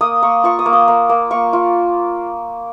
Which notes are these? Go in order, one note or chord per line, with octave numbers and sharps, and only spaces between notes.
A#3 D#6
A#3 C#6
F4 C#6
D#6
A#3
D#6
A#3
A#3
A#3 C#6
F4